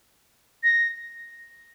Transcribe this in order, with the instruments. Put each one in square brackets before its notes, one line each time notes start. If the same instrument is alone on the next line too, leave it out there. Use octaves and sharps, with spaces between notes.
[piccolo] A#6